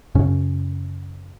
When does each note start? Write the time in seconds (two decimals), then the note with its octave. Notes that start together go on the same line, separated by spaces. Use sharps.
0.15 F#2 C#3 C#4